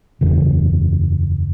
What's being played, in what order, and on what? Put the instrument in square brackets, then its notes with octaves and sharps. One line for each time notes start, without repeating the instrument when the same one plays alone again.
[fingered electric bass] F#1 E2 C#3